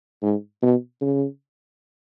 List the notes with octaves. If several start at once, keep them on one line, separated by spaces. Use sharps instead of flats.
G#2
B2
C#3